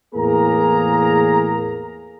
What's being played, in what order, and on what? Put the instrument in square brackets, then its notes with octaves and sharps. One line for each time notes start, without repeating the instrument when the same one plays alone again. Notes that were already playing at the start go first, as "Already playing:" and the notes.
[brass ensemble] E2 A2 A#3 G#4 A#4 A#5